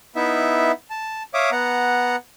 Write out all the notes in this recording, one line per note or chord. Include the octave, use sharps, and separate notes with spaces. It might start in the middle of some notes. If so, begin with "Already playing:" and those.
B3 D#4 E4 E5
A5
C#5 E5 F5 D6 D#6
B3 F#5 A#5